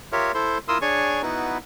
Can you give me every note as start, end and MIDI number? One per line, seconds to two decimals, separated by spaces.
0.12 0.32 65
0.12 0.32 67
0.12 0.32 70
0.12 0.32 73
0.12 0.32 76
0.34 0.58 64
0.34 0.58 69
0.34 0.58 72
0.34 0.58 84
0.68 0.78 64
0.68 0.78 65
0.68 0.78 70
0.68 0.78 84
0.68 0.78 87
0.68 0.78 88
0.81 1.22 62
0.81 1.22 68
0.81 1.22 73
0.81 1.22 74
0.81 1.22 80
0.81 1.22 85
1.22 1.58 59
1.22 1.58 63
1.22 1.58 64
1.22 1.58 66
1.22 1.58 71